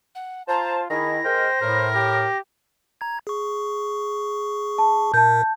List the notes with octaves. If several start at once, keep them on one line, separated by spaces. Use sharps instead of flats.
F#5
F4 C5 A5 A#5
D#3 E4 G#4 A#6
G#3 A#4 C5 G5
A2 A#4
G4
A#5 G#6
G#4 C#6
A5
A#2 A#4 A5 G6